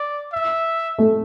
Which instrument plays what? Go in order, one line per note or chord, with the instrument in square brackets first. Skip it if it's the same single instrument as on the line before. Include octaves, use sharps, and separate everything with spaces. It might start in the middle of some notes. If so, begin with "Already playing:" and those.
Already playing: [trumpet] D5
E5
[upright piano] A3